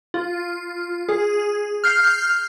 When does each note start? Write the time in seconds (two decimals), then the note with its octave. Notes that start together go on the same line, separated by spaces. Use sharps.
0.14 F4
1.09 G#4
1.84 F6 G6 C7